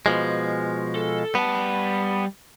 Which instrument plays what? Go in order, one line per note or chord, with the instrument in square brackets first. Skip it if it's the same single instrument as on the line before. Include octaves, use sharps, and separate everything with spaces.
[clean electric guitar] B2 F3 G#3
[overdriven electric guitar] A4
[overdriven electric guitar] G3 A5 [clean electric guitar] B3